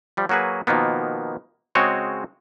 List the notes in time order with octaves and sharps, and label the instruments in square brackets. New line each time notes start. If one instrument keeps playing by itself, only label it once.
[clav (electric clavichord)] F3 G3
F#3 A#3 F#4 G#4 B4
B2 D#3 F3 A#3 B3
C#3 G#3 C4 F#4 C#5 D#5